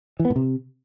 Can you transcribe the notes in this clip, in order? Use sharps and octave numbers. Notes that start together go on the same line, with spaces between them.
E3
B3
A2
C3